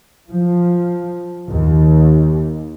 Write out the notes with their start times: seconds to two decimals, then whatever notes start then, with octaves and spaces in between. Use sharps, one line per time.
0.29 F3
1.50 D#2